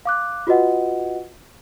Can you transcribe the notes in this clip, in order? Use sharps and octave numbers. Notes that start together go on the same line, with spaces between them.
F5 D6 F#6
F4 F#4 B4 D#5 F#5